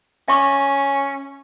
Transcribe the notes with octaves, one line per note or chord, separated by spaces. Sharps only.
C#4 E5 C#6 D6